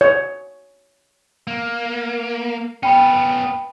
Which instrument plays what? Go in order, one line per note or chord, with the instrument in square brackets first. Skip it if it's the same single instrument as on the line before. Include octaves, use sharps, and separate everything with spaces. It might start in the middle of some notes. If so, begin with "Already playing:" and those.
[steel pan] C#5
[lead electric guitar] A#3
[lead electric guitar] B3 C#4 [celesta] G5 B5